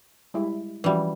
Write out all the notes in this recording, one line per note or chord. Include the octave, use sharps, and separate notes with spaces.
G3 G#3 E4
E3 F3 G3 C#4 F#4